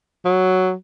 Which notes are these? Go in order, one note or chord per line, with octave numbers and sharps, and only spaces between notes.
F#3